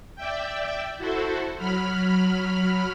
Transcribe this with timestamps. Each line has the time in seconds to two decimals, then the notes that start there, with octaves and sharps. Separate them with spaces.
0.16 D5 E5 G5
0.98 E4 F#4 A4 C5
1.58 F#3 B5 F6